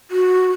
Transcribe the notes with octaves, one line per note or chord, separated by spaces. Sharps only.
F#4